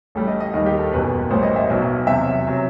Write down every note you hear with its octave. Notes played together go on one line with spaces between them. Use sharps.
A1 A2 G3 A4
D#5
D#5
D#2 D#3 G3 D#5
G4
A4
F#1 E2 B2 B4
A1 A2 G3 C5
D#5
E5
B1 B2 F#3
E2 C3 F#3 E5
C3 F#3